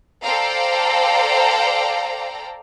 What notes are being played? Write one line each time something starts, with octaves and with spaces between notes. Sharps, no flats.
A4 C5 D5 F5 G5 A#5